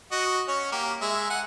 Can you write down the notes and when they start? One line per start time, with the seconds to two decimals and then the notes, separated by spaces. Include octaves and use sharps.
0.12 F#4 D#5
0.48 C#4 C#5
0.72 A#3 G4
1.01 G#3 E5
1.30 F#5 G#5